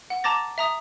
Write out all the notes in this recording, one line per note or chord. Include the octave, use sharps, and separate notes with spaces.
F#5
A5 A#5 D6 A6 A#6
E5 A#5 D#6